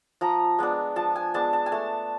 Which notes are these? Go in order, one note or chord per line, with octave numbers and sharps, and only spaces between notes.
F3 A#5
G#3 B3 D4
F3 A5
G#5
G#3 B3 D4 A5
A5
G#5
A3 A5